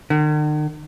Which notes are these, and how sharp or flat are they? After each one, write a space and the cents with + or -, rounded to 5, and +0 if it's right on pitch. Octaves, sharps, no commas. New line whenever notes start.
D#3 -45